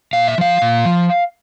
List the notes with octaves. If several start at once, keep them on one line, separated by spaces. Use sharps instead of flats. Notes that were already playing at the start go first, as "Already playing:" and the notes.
A#2 F5
E5
F3 F5
A#2
F3